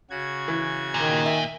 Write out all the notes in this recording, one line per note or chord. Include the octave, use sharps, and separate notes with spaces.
C#3 F#4 G#6
E3
A#2 D#3
E5